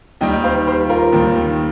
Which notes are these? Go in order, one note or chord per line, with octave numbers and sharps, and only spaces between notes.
D#2 D#3 G3 D#5 G5
C5 F5
G4 C5
F4 A#4
D#2 D#3 G3